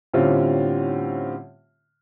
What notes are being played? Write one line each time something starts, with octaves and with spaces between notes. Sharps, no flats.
A2 D3 G3 C4 C#4 F4